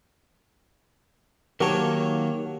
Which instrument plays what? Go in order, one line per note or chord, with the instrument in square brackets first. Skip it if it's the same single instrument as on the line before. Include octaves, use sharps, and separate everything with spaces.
[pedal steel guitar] D#3 A#3 [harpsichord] F#3 C#5 [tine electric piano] G4 [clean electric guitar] A#4 F#5 A5